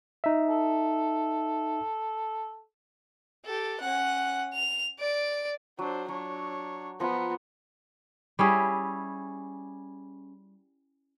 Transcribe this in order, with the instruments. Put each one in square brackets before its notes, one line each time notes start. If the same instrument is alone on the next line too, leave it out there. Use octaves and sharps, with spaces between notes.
[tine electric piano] D#4 E5
[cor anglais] A4
[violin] G4 A4
C#4 F#5
F7
D5 D7
[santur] F#3 [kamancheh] D4 C5
[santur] F#3 [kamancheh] D4 C#5
[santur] F3 A#5 [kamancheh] B3
[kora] G3 C#4 E4 G#4